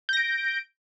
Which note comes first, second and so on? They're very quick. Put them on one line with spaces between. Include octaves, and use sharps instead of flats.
G6 A#6 D7